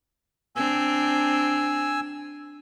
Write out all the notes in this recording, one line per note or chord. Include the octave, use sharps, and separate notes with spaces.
C4 D4 G#5 E6